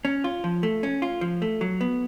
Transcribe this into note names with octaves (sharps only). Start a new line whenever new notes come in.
C#4
F4
F3
A3
C#4
F4
F3
A3
F#3
B3